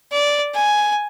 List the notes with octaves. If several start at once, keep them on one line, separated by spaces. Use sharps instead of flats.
D5
G#5